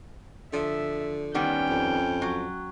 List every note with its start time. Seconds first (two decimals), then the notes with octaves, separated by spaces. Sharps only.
0.53 D3 F3 E5
1.35 D#3 G3 B3 C#4 G5
1.70 F2
2.22 F#3